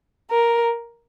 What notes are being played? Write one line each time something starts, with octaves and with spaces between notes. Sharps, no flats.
A#4